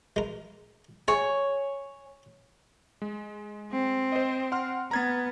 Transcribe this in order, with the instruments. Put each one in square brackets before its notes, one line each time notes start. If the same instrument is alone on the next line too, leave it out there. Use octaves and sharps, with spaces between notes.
[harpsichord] G#3 A#4
[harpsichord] G#4 [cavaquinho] C#5 G#5
[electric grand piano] G#3
[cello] C4
[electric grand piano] C5 D#5
F#5 C6 F6
[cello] B3 [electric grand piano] A#5 G#6 A6